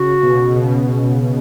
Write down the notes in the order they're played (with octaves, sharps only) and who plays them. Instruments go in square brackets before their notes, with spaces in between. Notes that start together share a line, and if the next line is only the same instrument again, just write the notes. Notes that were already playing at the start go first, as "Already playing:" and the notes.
Already playing: [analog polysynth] C#3 [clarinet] F#4
[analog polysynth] B2
B2
B2